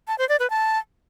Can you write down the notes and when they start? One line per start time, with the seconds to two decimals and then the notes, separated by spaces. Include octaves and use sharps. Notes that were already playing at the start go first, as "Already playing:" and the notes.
0.08 A5
0.18 C5
0.29 D5
0.40 B4
0.50 A5